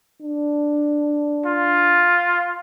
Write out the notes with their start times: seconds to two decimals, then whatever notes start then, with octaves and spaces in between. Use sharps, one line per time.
0.22 D4
1.46 F4